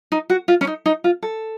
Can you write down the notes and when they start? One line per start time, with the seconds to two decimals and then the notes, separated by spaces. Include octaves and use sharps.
0.12 D#4
0.30 F#4
0.48 F4
0.61 C#4
0.67 D#4
0.86 D#4
1.04 F4
1.23 A4